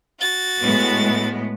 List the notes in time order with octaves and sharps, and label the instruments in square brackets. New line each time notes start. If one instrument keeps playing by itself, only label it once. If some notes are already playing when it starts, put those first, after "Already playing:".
[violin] F#4 A6
[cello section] A2 G#3 B3